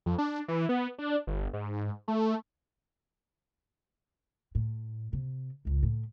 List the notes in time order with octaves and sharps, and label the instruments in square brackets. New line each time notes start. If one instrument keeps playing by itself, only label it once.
[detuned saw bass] F2
D4
E3
B3
D4
G1
G#2
A3
[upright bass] A2
C3
G#1 C#2
A2